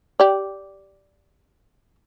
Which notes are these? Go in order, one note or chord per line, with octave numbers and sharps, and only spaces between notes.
G4 D5